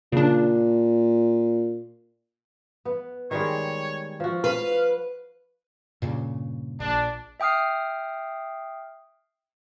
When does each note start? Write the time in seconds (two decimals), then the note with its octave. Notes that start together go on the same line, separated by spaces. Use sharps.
0.12 A#2 C#3 D4
2.85 B3
3.31 D#3 G3 G#3 C#5
4.20 F3 F#4
4.44 B4 F5
6.02 G2 A#2 C#3
6.80 A#1 D4
7.40 E5 G5 D#6 F6 C7